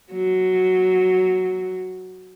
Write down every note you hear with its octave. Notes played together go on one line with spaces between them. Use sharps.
F#3